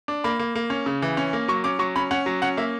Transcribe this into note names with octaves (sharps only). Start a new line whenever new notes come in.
D4
A#3 B5
A#3
A#3
C#4
C#3
E3
C#4
A#3
F#3 C#6
C#4 D6
F#3 C#6
C#4 B5
C#4 F#5
F#3
C#4 F#5
A#3 E5